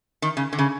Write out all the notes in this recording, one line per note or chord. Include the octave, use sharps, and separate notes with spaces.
D#3
C#3
D3
C#3